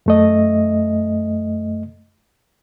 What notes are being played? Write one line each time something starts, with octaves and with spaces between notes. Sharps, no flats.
F#2 A3 D#5